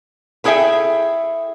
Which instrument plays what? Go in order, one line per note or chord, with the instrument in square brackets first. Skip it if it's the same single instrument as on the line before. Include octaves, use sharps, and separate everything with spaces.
[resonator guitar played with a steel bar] B3 E4 G#4 A4 E5 G5